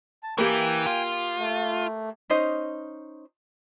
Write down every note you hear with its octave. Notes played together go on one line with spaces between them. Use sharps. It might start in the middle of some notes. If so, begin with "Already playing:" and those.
A5
E3 A#3 G4 G5 G#5
F4
A3
C#4 D#4 C5 D#5